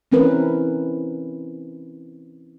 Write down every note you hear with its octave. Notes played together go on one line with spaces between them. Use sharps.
E3 C4 C#4 E4 A#4 B4